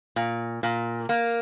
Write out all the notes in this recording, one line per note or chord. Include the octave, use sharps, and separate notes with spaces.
A#2
A#2
A#3